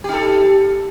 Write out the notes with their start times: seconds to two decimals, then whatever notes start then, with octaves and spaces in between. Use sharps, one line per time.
0.04 G4
0.09 D#4
0.13 A4